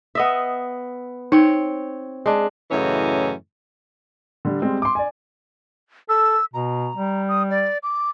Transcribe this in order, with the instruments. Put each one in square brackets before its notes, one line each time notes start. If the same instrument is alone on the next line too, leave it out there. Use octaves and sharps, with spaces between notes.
[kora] B3 D#5 E5
[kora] C4 C#5 [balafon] D#4
[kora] G#3 D4
[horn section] F#2 A2 C#3 E3 C#4 D#5
[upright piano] D3 G3
G3 G#3 C4
C6 D6
D5 G#5
[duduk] A4 [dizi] E6
[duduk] B2 [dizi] A#5
[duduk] G3
[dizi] D#6
D5
D6